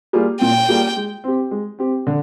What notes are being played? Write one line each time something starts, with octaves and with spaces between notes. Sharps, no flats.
G3 A#3 F4 G#4
A#2 G5
G3 A#3 F4 G#4
G#3
C4 G4
G#3
C4 G4
D3